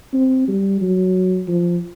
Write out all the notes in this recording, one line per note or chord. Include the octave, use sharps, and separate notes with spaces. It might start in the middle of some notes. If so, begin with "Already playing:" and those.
C4
G3
F#3
F3